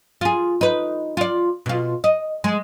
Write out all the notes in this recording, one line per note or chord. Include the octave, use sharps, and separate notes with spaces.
F4 G#4
D#4 B4
F4 D5
B2 F4
D#5
G#3